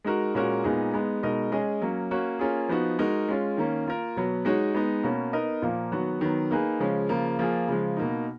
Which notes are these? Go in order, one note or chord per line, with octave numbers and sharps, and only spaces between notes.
G#3 D#4 F#4 A#4
A#2 G#3 C#4 F#4 A#4
A#2 G#3 B3 D#4 G#4
G#3 B3 D#4
B2 G#3 D#4 A#4 D#5
G#3 C#4 G#4 D#5
F#3 A#3 C#4
A#3 C#4 F#4 C#5
A#3 C#4 F4 G#4
F3 B3 D#4 F#4
G#3 D#4 F#4 A#4
G#3 C#4 F4
D#3 A#3 C#4
A#3 F4 A#4
B2 F#3 B3
G#3 D#4 F#4 C#5
G#3 B3 D#4
B2 A#3 C#4
B3 D#4 A#4 D#5
A#2 F3 A#3
D#3 F#3 B3 F#4
D#3 F#3 B3
A#3 D#4 G#4 B4
C#3 F3 G#3 C#4
C#3 F3 A#3 F4
F3 A#3 F4 G#4
C#3 F3 G#3
B2 A#3 D#4